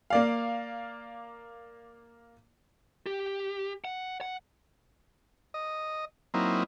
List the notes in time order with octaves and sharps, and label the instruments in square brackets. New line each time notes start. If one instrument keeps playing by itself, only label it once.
[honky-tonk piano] A#3 D5 F5
[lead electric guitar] G4
F#5
F#5
[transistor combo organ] D#5
F#3 A#3 C4 D#4 E4